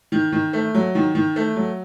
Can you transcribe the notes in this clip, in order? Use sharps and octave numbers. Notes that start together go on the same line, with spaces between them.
D#3
D#3
A3
F#3
D#3
D#3
A3
F#3